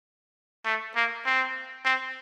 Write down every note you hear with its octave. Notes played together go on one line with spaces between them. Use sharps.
A3
A#3
C4
C4